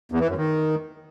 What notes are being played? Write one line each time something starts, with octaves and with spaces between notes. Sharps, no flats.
E2
E3
F#2
D#3